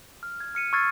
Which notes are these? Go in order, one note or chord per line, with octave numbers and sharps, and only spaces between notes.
F6
G#6
F6 C#7 D#7
C#6 E6 F6 G#6 A6 C7